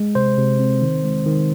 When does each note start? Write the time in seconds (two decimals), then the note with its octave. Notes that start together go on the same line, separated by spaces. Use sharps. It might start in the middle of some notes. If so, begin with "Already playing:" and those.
Already playing: G#3
0.15 C3 C5
0.38 C3
0.60 C4
0.82 D#3
1.04 G#3
1.26 D#3